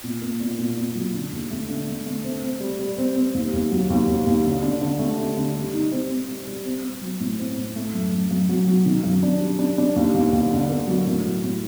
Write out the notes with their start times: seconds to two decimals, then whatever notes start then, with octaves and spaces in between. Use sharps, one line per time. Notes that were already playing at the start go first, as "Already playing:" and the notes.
0.04 A#2
0.22 A#3
0.40 A#2
0.59 A#2
0.77 A#2
0.95 F#3
1.13 D3
1.32 D#2
1.50 A3
1.69 D3
1.87 A3
2.06 A3
2.24 C4
2.42 C4
2.60 G3
2.79 G3
2.98 C4
3.16 C4
3.34 D#2
3.53 D#2
3.71 F#3
3.90 D#2
4.07 D#2
4.27 D#2
4.44 D3
4.63 D4
4.81 D3
4.99 A3
5.18 D4
5.37 D3
5.54 G3
5.73 D#4
5.91 C4
6.10 C4
6.28 G3
6.47 G3
6.65 C4
6.83 C4
7.01 F#3
7.20 A2
7.39 C4
7.57 A2
7.76 A3
7.94 F#2
8.12 F#2
8.31 F#2
8.49 F#3
8.67 F#3
8.86 D#3
9.04 F#2
9.23 D4
9.40 G3
9.59 D4
9.78 D4
9.96 D#2
10.14 D#2
10.33 D#2
10.51 D3
10.69 A#3
10.88 F#3
11.06 A2
11.24 F#3
11.43 A2